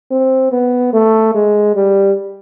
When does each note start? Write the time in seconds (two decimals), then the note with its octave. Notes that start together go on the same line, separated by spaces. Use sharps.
0.11 C4
0.52 B3
0.93 A3
1.35 G#3
1.75 G3